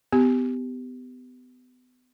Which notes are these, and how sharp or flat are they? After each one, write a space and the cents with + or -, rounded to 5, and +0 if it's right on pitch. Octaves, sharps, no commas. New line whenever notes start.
B3 +30 G4 +0